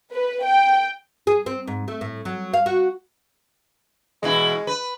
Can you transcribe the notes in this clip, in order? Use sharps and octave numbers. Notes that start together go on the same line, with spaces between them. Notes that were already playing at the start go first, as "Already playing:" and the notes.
B4
G5
G#4
C4
G#2
A3
A2
F#3
F5
F#4
E2 B2 G#3 E4
B4